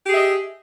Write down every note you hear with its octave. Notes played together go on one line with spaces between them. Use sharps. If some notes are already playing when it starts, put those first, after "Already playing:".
G4 G#4 D#5 E5